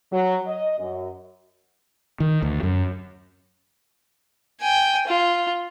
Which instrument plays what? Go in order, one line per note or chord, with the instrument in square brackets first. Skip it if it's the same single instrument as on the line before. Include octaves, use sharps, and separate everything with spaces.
[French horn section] F#3
D#5
F#2
[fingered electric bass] D#3
D2
F#2
[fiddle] G5 G#5
F4